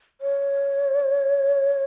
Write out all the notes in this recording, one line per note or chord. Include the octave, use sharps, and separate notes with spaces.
C#5